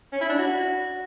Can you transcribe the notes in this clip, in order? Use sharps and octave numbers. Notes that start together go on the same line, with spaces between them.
C#4
E4
D4
F#4